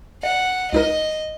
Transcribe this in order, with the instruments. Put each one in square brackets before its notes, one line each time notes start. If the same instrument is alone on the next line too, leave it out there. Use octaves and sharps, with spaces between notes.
[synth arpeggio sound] D5 [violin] F#5
[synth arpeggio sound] C#2 D#4 A#4 [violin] D#5